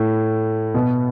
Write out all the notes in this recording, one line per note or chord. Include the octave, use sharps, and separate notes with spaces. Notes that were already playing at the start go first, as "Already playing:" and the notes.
Already playing: A2 A3
B2 B3